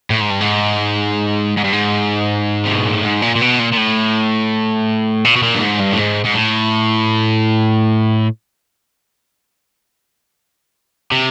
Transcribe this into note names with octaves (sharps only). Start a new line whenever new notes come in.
A2
G#2
G2
G#2
G#2
G2
G#2
C3
B2
A#2
A2
G#2
A#2
A#2
B2
A#2
A#2
A2
A#2
B2
A#2
G2
G#2
G2
A2
G#2
G#2
A2
C3